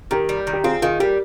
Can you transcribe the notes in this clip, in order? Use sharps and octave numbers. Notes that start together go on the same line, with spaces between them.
D#3 G4 A#4
G3
D#3
G4
C4 F4 G#4
D#3 F4 G#4
G3 G4 A#4